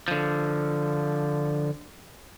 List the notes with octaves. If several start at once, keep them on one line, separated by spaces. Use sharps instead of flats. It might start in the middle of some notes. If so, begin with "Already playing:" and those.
D3 F3